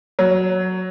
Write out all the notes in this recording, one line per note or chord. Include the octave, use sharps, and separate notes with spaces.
F#3